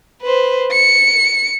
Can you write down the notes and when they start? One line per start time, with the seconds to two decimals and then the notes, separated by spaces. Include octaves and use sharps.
0.22 B4 C5
0.71 C#7